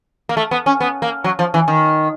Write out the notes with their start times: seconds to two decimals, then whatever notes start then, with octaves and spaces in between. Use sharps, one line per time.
0.29 A#3
0.37 A3
0.51 B3
0.66 C#4
0.80 B3
1.02 A#3
1.24 F#3
1.39 F3
1.54 E3
1.68 D#3